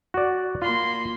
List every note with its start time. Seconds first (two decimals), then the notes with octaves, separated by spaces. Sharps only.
0.14 F#4 D5
0.62 A#3 F4 B5 C6